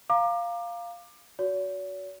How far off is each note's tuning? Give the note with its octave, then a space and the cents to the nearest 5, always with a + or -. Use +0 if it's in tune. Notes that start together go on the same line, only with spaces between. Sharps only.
F5 +0 A#5 +0 D6 +25
F#4 +0 C#5 +45